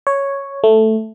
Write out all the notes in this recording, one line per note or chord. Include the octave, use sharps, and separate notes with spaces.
C#5
A3